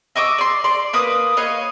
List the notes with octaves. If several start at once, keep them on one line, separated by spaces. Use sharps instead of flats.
D#5 C#6 D6 E6
D5 C6
D5 C6
A#3 A#4 B4 D#6
B4 C#5 D#5 F5